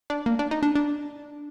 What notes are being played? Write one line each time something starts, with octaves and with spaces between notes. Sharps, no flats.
D4
A#3
D4
D#4
D4
D4